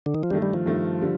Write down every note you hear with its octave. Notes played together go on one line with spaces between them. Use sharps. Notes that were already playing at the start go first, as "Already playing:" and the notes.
D3
D#3
F3
G2 D#3 G3 A3
G3
F3
G2 D#3 A3
D3 G3